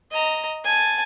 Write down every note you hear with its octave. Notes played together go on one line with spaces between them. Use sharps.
D#5 A#5
G#5 A5